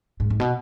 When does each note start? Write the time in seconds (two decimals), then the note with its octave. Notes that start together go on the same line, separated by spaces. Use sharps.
0.20 G#2
0.30 G#2
0.40 B2